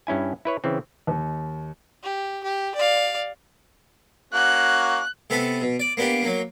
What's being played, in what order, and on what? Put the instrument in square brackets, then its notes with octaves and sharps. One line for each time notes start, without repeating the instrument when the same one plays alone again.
[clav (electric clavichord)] G2 C#4 E4 G#5
E4 B4 C#5
C#3 E3 C4
[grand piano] D#2
[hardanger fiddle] G4
G4
D5 F5
[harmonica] A#3 C#4 F#4 [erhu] F#6
[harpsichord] C3 B3 A4 A5 B5
B2
D5
A#3 B3 D4 G4
F#3 A#3